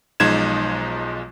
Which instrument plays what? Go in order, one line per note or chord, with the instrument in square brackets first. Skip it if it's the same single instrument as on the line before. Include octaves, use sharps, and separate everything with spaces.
[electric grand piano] B1 F3 G#3 D#4 G#6 E7